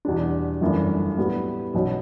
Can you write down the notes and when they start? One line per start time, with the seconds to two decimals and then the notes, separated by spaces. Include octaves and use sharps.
0.05 E2 B2 G3 D4
0.61 G1 F#2 E3 A3 D4
1.18 A2 G3 B3 F#4
1.74 B1 B2 F#3 C#4